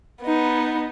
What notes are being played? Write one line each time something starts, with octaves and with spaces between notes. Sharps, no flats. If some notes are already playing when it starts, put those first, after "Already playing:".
B3 D#4